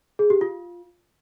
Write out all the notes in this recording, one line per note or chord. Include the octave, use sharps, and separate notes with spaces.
G#4
G4
F4